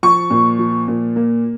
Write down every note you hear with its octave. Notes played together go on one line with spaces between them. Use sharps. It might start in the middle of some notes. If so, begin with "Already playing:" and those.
F3 C#6
A#2
F3
A#2
A#3